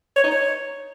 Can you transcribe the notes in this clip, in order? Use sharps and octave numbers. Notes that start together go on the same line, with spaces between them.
C#5
D#4
C#5